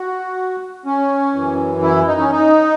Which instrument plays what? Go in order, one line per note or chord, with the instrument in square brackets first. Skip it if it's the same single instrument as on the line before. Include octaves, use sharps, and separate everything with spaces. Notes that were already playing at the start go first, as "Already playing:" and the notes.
Already playing: [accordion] F#4
C#4
F#2 E3
E4
D#4
C#4
D#4